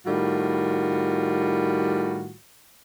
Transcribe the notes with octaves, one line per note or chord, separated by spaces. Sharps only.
A2 D#3 G3 F4 F#4